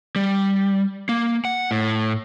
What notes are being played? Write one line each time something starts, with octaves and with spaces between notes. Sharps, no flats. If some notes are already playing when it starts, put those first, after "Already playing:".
G3
A#3
F#5
A2